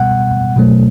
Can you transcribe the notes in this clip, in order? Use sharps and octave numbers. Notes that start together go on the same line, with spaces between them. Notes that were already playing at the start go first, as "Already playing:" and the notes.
Already playing: B2 G3 B3 F#5
B2 F#3 A3